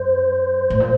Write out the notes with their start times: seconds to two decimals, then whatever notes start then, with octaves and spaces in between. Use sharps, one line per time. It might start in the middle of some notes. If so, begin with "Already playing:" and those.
Already playing: F#2 C5
0.70 A2
0.80 A#2